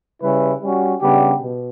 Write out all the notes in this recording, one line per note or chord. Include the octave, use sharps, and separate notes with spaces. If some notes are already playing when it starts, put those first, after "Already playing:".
C#3 G3 C#4 E4 B4
G3 C#4 F#4
C#3 G3 B3 D4 G4
B2